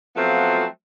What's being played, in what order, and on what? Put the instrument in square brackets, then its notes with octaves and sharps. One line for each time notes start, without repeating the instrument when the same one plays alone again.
[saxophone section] F3 F#3 A3 B3 C4 F4